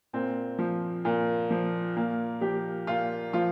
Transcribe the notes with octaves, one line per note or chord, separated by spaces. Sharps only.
A#2 C4
F3
A#2
F3
A#2 A#3
F3 G4
A#2 F4
F3 F4